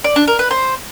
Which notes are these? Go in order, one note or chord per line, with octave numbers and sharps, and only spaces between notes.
D5
D4
A#4
B4
C5